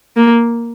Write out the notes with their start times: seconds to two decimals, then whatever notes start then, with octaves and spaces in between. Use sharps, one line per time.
0.16 A#3